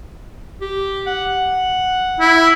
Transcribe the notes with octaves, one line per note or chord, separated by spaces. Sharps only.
G4
F#5
E4